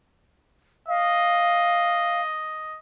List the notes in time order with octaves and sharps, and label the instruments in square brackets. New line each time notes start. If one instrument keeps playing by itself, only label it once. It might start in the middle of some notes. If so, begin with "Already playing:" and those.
[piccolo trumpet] D#5 [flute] F5